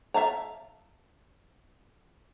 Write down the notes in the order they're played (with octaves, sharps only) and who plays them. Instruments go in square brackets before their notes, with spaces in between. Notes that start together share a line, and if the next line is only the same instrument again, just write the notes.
[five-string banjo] E5 F5 A5 A#5